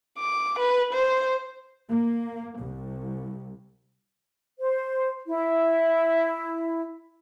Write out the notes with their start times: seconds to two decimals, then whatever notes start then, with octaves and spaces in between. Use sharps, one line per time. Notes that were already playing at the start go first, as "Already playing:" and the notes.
0.18 D6
0.59 B4
0.93 C5
1.91 A#3
2.58 C2
4.60 C5
5.27 E4